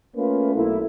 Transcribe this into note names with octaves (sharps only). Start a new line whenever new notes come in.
A3 A#3 C#4 F4 B4
B1 A3 A#3 E4